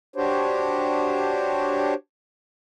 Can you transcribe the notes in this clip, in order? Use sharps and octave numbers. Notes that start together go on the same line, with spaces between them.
D4 F#4 G4 C5 C#5